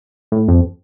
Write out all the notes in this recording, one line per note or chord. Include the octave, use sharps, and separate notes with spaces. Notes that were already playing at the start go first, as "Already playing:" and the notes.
A2
F2